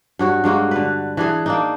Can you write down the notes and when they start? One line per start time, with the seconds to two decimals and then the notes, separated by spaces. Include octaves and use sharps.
0.19 G2 F#4 C#5
0.44 G2 G#3 A#3 F#4
0.71 D3 B4
1.17 E3 D4 G#4
1.46 A#3 D4 D#4